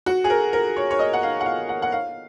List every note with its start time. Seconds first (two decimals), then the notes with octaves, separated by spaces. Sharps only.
0.06 F#4
0.24 G#4
0.30 A#4
0.53 A#4
0.76 C#5
0.91 C#5
0.99 D#5
1.13 F#5
1.23 F5
1.41 F#5
1.46 F5
1.69 F#5
1.82 F#5
1.92 F5